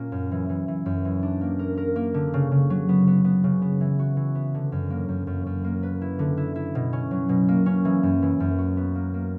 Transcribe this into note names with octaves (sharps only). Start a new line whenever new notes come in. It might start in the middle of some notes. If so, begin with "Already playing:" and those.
Already playing: A#2 A#3 C#4
F#2
E3
E3
E3
F#2
E3
D4
A#3
A#4
A#4
A#3
D3
C#3
C#3
F#3
B3
B3
B3
C#3
B3
E3
F#4
E3
B3
D3
F#2
A#3
F#2
F#2
F#2
A#3
B4
E4
D3
E4
E4
B2
C#4
F#3
B2
A#3
C#4
E3
F#2
E3
F#2
F#4
B3
A#3
A#3